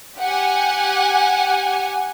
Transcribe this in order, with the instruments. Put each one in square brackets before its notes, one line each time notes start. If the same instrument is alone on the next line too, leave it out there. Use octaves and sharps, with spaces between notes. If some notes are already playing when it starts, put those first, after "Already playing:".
[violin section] G4 F#5 G#5